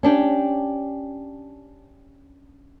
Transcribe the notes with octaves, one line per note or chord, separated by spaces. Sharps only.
C#4 D4 G4